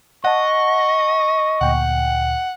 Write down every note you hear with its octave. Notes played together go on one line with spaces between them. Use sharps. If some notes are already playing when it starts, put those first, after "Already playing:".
D#5 F#5 A5 C#6
D2 A#2 F#5 G5